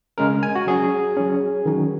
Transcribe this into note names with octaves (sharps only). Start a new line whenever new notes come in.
C#3 G#3 C#4 A#4
G#5
F#4
F#3 C#4 G#4
F#3 C#4
D#3 F#3 C#4